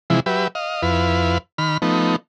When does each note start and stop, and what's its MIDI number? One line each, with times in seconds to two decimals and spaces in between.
0.10 0.20 48
0.10 0.20 52
0.10 0.20 53
0.10 0.20 56
0.10 0.20 64
0.26 0.48 54
0.26 0.48 67
0.26 0.48 71
0.26 0.48 76
0.55 0.82 75
0.55 0.82 77
0.83 1.38 41
0.83 1.38 64
0.83 1.38 71
0.83 1.38 77
1.58 1.77 51
1.58 1.77 83
1.58 1.77 89
1.82 2.16 53
1.82 2.16 57
1.82 2.16 59
1.82 2.16 63